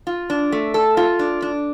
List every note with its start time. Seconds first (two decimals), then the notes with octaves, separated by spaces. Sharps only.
0.07 F4
0.30 D4
0.52 A3
0.74 A4
0.97 F4
1.19 D4
1.42 D4